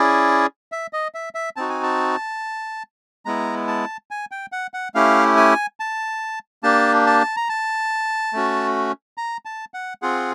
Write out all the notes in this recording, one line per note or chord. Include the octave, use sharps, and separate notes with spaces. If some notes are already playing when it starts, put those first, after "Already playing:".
Already playing: C#4 E4 G#4 D5
E5
D#5
E5
E5
C4 D#4 F#4 A5
G#5
A5
G#3 B3 E4 A#5
A5
G#5
G5
F#5
F#5
A3 C#4 E4 G4 F5
G#5
A5
A#3 D4 G4 A5
A5
A#5
A5
A3 C#4 F#4
A#5
A5
F#5
C4 F4 G#4 F#5